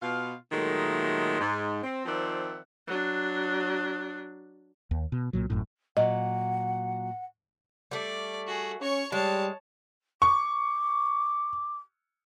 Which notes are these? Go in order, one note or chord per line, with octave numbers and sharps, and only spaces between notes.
B2 F4 F5
A#2 D#3 F#3 G#3 A3
G#2
C4
D#3 F3 C4 D5 E5 F#5
F#3 D4
D#2
B2
C2 A#2 F#3
G#1 F#2 A2
A#2 F#3 D#5 F#5
G3 A3 D5
F#4 G#4
C#4 C#5 C#6
G3 G#3 C#5 A5
C#6 D6